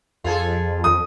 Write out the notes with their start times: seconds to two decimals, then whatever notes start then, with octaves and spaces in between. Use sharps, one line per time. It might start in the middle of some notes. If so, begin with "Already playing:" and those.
0.24 F2 F4 G#4 A4
0.84 D#6